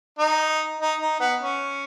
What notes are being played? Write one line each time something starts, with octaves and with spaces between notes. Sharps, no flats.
D#4
D#4
D#4
B3
C#4